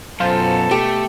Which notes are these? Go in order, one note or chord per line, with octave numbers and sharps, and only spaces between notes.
F#2 B2 F4 A4 C5
A3 G4